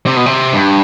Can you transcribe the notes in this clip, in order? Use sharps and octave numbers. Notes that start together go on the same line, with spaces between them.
C3
B2
C3
G2